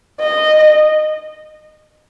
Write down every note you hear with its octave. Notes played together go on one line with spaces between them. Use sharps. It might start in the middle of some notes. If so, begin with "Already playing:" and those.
D#5